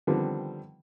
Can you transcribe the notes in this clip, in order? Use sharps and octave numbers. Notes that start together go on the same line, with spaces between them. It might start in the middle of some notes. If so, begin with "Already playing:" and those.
D3 D#3 F3 G3 B3 C4